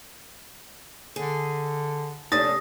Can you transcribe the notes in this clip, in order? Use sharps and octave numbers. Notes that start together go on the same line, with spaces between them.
D3 G#4
C3 A3 C#4 D4 D#6 A6 A#6